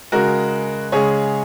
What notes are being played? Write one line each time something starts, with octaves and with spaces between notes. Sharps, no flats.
C#3 G#3 F#4 A#4
C#3 G#3 G#4 C#5